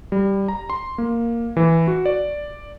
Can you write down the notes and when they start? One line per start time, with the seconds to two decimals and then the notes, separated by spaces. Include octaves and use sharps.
0.12 G3
0.48 A#5
0.70 C6
0.98 A#3
1.57 E3
1.88 F#4
2.06 D5